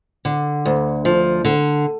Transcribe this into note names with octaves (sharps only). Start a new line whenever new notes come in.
D3
D2
F3
D3